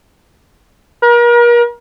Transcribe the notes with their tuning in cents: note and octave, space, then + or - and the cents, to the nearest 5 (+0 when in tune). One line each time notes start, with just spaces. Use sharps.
A#4 +40